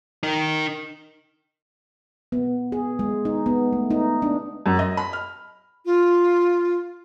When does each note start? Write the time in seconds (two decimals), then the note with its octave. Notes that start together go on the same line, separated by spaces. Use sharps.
0.23 D#4 A#4
2.32 B3
2.72 G#4
2.99 G#3
3.25 D#4
3.46 B3
3.73 A3
3.91 D#4
4.22 D4
4.66 F#2
4.79 D#5
4.97 B5
5.13 F6
5.86 F4